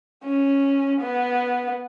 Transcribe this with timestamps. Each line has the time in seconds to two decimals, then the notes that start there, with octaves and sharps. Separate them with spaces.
0.24 C#4
1.01 B3